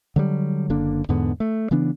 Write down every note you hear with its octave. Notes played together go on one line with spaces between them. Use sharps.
D3 F#3 G3
F#1 D3 A#3 D4
E2 G#2 D3 B3
A3
C#3 E3 B3 D4